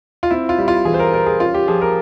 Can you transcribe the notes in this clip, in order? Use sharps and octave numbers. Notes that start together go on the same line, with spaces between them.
F4
C4 E4
F4
G3
F4
E3 G#4
C5
A#4
G3 A#4
G#4
C#4 F4
G4
F3 G#4
A#4